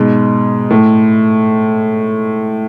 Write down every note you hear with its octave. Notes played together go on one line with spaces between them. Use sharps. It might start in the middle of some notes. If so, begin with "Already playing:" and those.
Already playing: G#2 B2
A2